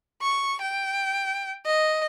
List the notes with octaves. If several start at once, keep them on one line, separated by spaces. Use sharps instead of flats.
C#6
G5
D#5